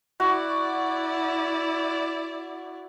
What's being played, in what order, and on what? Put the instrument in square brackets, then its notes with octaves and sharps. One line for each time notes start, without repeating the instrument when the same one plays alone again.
[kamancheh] E4 D5 [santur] F#4